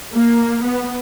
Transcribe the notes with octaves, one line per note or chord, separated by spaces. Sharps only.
A#3
B3